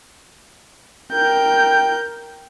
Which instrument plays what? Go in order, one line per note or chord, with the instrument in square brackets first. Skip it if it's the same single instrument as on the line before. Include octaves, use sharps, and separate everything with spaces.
[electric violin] A#4 G6 [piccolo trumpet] G5